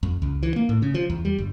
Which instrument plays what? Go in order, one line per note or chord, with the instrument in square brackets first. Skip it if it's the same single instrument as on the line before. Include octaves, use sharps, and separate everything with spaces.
[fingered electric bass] F2
C#2
E3
A#3
A2
C#3
F3
E2
G3
G1